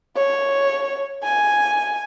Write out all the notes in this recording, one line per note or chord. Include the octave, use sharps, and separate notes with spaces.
C#5
G#5